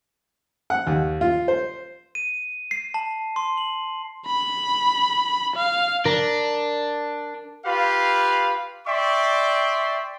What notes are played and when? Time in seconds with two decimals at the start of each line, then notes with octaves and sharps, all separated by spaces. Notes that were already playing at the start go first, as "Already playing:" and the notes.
0.70 F#5
0.87 D#2
1.21 F4
1.48 C5
2.15 D#7
2.71 C7
2.94 A5
3.36 C6
3.57 F#7
4.26 B5
5.56 F5
6.05 D4 A#4
7.65 F4 G4 B4 F5
8.87 D5 E5 G5 C6 C#6